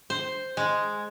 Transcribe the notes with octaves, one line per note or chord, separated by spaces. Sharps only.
C5
G#3